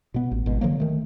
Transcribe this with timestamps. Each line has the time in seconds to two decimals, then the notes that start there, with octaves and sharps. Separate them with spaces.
0.14 B2 B3
0.31 A1
0.46 G#1 B2
0.61 D3 F3 F#3 A#3
0.80 D#3 A3